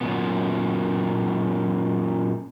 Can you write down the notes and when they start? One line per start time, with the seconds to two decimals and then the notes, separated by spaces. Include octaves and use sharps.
0.01 F#2 A#2 B3